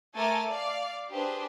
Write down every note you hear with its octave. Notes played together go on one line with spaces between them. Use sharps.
A3 A4 A#4 G#5 D6 A6
D5 F5 D6
D4 G4 G#4 B4 C5